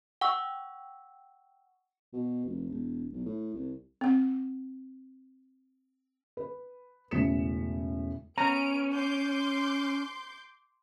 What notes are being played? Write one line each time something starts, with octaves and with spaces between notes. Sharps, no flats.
F#5 G5 C#6 E6
B2
F1
E1
B1
A2
C2
C4 F#5
B4
E1 A2 C#3 B6 C#7 E7
B3 C#4 A#5 D7
C6 D6 G6